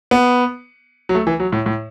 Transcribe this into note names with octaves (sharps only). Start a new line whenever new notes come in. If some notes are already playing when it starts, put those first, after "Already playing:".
B3
F#3
A3
E3
F#3
A2
A2